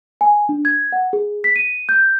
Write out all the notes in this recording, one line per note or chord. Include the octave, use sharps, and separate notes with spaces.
G#5
D4
G#6
F#5
G#4
B6
D#7
G6